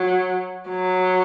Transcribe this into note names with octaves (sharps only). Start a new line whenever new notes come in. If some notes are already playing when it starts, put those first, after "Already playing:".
Already playing: F#3
F#3